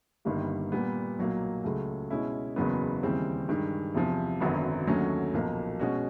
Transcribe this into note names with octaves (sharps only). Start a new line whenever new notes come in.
G1 G2 D#3 G3 A#3
A#2 G3 B3
B1 A#2 F#3 A#3
C#2 C#3 F#3 A3
B2 G#3 C#4 E4
F#1 E2 C#3 F#3 B3
D#2 C#3 E3 G3 C4
G2 D#3 G#3
E2 C3 F3
G#1 F#2 D3 F#3 B3
D#2 D3 F#3 A3 C#4
B1 A#2 F3 A#3
B2 G#3 C#4 F#4